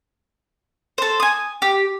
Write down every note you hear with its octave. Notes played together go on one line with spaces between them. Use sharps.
A4 C5
G#5 D#6
G4